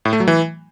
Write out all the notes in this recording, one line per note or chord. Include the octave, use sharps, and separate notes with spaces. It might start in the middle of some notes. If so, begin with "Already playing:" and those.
A2
A3
F#3
E3